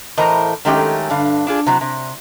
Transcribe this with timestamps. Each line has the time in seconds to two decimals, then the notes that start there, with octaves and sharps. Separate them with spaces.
0.17 A2 E3 A#4 C5 D#5 A#5
0.65 D#3 F#3 G#3 A3 C#4 G4
1.10 G2 D3 F5
1.47 D4 F4 G#4
1.66 C3 F#3 E4
1.81 C3